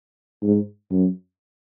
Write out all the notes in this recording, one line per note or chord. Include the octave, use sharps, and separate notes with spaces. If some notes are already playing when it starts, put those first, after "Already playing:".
G#2
F#2